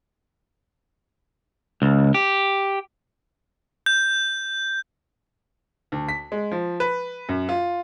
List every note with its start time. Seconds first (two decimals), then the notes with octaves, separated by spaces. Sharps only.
1.82 C#2
2.14 G4
3.86 G6
5.92 D2
6.08 B6
6.32 G#3
6.52 F3
6.80 B4
7.29 F#2
7.49 F4